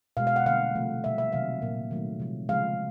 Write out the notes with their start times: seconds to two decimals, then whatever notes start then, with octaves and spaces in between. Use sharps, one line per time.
0.17 B2 G#3 F5
0.27 F5
0.36 F#5
0.46 D3 G3 A#3 F5
0.75 C3 F3 A3
1.04 B2 G3 A#3 E5
1.18 E5
1.33 C3 D#3 F#3 A3 F5
1.62 A#2 F#3 A#3
1.91 D#3 F#3 A3
2.20 C3 F3 G#3
2.49 C#3 F3 G#3 F5